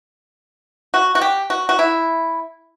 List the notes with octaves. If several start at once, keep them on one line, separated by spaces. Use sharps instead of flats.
F#4
F#4
G4
F#4
F#4
E4